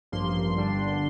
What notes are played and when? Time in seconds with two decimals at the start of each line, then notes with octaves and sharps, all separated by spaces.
0.12 A1 G2 F3 A#3 C6
0.55 G1 G2 D3 G3 D4